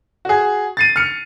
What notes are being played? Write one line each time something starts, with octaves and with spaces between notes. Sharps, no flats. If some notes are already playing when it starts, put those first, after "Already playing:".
F#4 G#4
A6 C7 D#7
F6 C#7